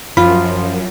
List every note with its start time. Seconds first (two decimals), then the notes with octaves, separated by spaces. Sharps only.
0.17 F#2 F3 F4 B5